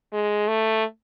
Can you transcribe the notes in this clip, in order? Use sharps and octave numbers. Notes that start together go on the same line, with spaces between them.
G#3
A3